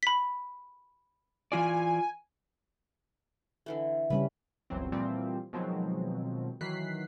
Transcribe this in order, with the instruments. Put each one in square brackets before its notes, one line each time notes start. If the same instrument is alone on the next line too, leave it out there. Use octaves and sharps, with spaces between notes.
[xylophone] B5 B6
[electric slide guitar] E3 F4 D5 [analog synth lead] G#5
[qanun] D3 E3 A3
[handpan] C#3 G3 C#4 [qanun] B4
[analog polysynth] G1 C#2 E3 F#3 C4
A#2 E3 F3 G3 C4
B2 D#3 F3 F#3 G#3 C4
D#3 E3 F#3 F#6 B6 C7